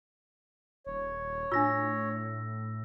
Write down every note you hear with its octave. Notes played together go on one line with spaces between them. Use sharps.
D#1 C#5
A2 D4 F4 E6 A#6